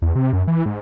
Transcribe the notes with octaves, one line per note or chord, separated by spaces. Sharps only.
E2
C3
F#2
E3
G#2